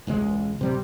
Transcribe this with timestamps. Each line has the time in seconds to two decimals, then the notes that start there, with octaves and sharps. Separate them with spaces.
0.07 E1 C#2 A2 G#3
0.59 D1 C3 G3